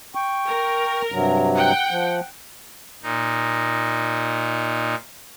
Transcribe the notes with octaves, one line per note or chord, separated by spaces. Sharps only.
G5 C#6
A#4 A#5
G2 C3 F#3
F#5 G5
F3
A#2 D#4